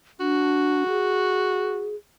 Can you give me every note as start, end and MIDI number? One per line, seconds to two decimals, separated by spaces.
0.20 0.84 62
0.20 1.94 66
0.88 1.96 68